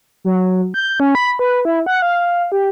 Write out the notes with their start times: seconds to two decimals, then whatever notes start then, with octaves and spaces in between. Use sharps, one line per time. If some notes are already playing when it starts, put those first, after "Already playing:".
0.25 F#3
0.74 G6
1.00 C#4
1.15 B5
1.39 B4
1.65 E4
1.86 F#5
2.02 F5
2.52 G4